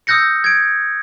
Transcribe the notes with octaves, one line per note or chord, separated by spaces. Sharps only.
D#6 E6 F#6 G6 A#6 C#7
G#6 D7